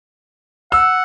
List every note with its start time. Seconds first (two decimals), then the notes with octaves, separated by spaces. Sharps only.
0.72 F#5 E6